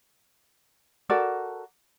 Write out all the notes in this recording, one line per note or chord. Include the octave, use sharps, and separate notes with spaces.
F#4 A4 A#4 D5